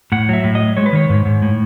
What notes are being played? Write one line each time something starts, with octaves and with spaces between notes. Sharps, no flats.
A2 F#5
F#3 E5
A2
D#5
F#3
G#3 C#5
B4
D#3 C#5
G#2
G#2
A2